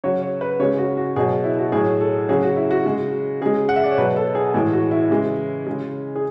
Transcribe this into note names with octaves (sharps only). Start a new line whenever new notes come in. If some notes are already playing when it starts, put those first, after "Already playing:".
C#3 F#3 C#5
C#5
B4
C#3 G#3 C#5
F#4
F#4
B2 F#3 G#4
E4
F#4
A2 F#3 G#4
A4
C#3 F#3 G#4
F#4
E4
F#4
C#3 G#3
C#3 G#3 G#4
F#5
E5
D5
C#5
B2 F#3 B4
A4
G#4
A2 E3 G#3 G#4
F#4
E4
C#3 E3 G#3
C#3 G#3
G#4